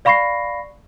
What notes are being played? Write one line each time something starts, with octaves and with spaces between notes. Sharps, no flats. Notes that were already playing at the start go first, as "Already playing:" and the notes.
D5 F5 B5 C#6 A#6 C7